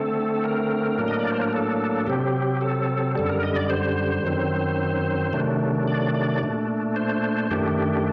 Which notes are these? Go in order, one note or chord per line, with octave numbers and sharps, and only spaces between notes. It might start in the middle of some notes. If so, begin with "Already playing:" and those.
Already playing: D3 A3 C4 A4
A#4
A2 F#3 A#3 D4
D#5
D5
C5
A#4
A4
C3 F#3 C4 G4
A4
F#2 D3 G3 A4
A#4
D#5
D5
C5
F#2 D#3 F#3 C4
C3 D#3 F#3 A3 D4
D5
D5
A#2 A3 D4
C5
F#2 D#3 A3 D4 G4